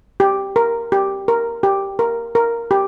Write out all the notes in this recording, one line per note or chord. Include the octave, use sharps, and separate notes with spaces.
G4
A#4
G4
A#4
G4
A#4
A#4
G4